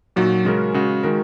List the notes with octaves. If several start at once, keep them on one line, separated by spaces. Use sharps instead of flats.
A#2 F#3 D#4 F#4
C#3 G#3 C#4 F#4 A#4
C#3 G#3 F#4
D#3 G#3 F#4 A#4